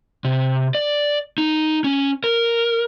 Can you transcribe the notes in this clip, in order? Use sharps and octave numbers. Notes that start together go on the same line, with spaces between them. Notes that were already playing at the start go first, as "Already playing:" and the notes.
C3
D5
D#4
C#4
A#4